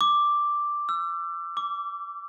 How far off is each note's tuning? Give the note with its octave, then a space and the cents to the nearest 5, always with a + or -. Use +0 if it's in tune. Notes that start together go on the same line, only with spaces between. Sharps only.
D6 +0
E6 +35
D6 -20